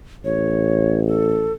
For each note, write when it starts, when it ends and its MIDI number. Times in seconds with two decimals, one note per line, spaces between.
0.25 1.56 33
0.25 1.01 73
1.07 1.53 69